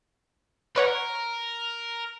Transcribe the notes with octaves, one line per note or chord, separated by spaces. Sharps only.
A#4 B4 C#5 F#5